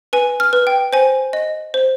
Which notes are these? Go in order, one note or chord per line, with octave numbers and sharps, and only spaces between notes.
B4 G#5
F6
B4
G5
C5 G#5
D#5
C5